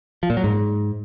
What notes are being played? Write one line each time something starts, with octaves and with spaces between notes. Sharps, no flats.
F3
A#2
F#3
G#2